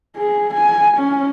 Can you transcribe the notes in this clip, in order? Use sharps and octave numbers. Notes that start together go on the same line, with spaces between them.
G#4
G#5
C#4